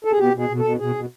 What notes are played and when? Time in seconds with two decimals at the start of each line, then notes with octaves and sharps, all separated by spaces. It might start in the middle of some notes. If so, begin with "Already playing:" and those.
0.05 A4
0.12 G#4
0.18 B2 G4
0.34 B2 G#4
0.49 B2
0.59 A4
0.64 B2
0.79 B2 G#4
0.95 B2